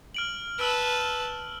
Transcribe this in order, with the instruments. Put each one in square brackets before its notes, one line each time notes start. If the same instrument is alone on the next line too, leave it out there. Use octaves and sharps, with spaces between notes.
[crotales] F6 D7 F#7
[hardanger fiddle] B4 A5 [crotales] E6 F6 D7